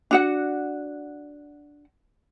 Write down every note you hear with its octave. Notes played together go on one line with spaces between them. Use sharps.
D4 F#4 F#5